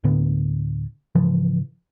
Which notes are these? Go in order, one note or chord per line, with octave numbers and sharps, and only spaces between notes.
D1 A2 D3 B3
G#2 C#3 E3 F3